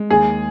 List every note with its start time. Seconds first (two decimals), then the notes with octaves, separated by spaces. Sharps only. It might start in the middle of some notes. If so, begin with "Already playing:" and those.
Already playing: G#3
0.10 D#2 G#4